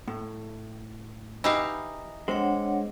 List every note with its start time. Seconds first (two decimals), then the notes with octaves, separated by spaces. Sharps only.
0.08 A2
1.44 E3 D#4 E4 G4 F5
2.28 G#3 C4 D4 C#5 F#5